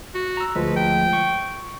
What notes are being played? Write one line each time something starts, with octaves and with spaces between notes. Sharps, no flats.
F#4
A#5 E6
D2 F3 G#3 B4
G5
C#6